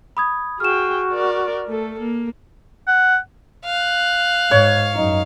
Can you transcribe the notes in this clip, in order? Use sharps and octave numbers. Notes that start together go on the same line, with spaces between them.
B5 D#6 G#6
F#4 G#4 G5 F6 E7
A#4 D5
A3 A4
A#3
F#5
F5 F#6
G#2 C#5
F#2 D#4